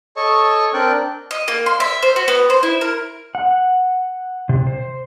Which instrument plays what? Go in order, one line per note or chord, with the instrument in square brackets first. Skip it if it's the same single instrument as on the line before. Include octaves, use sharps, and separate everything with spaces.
[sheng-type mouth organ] A4 C#5 D#5 A5 C#6
C4 D4 A#4 D5 G5 F#6
[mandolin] D#5
A#3
C6
E5
C5
F#4
B3
C5
E4
A#4
[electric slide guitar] F#5
C3
C5